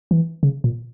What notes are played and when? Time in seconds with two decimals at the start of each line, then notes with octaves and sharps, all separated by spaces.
0.11 E3
0.43 C#3
0.64 A#2